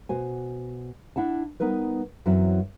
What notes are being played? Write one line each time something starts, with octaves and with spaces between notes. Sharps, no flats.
B2 F#4 C5 G#5
D4 E4 F#5 A5
G3 B3 D#4 A#4 B4
F#2 E3 F#3 C4 E4